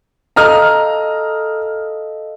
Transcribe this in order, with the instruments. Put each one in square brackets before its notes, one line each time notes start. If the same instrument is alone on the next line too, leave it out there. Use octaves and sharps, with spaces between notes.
[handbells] A4 D#5 F5 [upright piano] A#5 D#6 F6